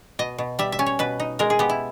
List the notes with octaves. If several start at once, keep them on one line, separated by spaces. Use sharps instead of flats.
B2 D#5
B2
G3 E5
E5
C#4
C#5
B2 B4
D#4
G#3 A#4
G#4
B3 G4
E4